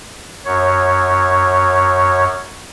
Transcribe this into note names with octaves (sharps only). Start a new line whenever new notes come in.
F#2 C#5